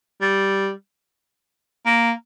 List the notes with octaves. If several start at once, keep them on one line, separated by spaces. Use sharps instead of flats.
G3
A#3